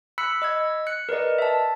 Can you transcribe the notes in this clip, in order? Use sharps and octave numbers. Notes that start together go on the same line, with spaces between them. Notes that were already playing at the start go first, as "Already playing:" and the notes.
B5 E6 F#6 B6 C#7
D#5 E6 G#6
F#6 C#7
A#4 B4 D5 D#5
E5 A5